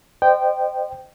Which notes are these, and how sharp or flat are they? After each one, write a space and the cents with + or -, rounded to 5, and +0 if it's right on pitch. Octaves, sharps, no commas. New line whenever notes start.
C5 -20 D#5 -40 G5 -5